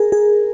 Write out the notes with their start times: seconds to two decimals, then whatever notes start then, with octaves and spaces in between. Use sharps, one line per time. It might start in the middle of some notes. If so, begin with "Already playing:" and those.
Already playing: G#4 A#4
0.12 G#4